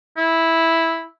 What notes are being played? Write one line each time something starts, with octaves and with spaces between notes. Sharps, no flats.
E4